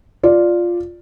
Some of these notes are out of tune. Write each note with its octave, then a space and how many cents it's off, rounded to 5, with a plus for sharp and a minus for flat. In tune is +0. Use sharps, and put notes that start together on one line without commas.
F4 +0 D5 +0